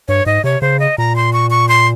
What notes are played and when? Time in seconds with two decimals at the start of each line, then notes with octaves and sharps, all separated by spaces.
0.08 G2 C#5
0.26 G#2 D#5
0.44 C3 C#5
0.61 C#3 C5
0.80 D#5
0.98 A#2 A#5
1.16 C6
1.33 C#6
1.50 C#6
1.69 C6